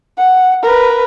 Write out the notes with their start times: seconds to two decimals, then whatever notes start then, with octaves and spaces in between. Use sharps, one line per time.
0.18 F#5
0.63 A#4 B4